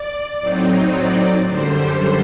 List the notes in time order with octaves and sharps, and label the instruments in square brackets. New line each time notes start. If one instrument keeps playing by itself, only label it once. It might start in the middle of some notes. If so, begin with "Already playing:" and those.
Already playing: [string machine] D5
A2 F#3 C4 D#4
D5
F#2 D3 G3 C5